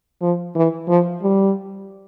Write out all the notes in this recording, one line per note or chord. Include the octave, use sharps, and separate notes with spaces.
F3
E3
F3
G3